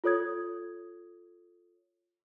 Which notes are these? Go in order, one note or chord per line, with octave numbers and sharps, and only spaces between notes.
F4 A4 C#5 D#6 G#6